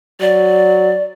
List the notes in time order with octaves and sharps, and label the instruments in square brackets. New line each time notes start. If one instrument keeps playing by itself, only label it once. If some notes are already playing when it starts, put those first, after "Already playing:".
[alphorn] F#3 [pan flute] D5